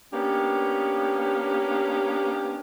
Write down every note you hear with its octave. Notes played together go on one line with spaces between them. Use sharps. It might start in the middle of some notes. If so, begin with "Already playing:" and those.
A#3 B3 C#4 D4 G4